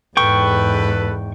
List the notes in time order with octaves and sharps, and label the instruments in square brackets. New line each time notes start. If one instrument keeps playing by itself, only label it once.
[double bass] E2 G#2 [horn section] A4 B4 [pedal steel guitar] G5 C#6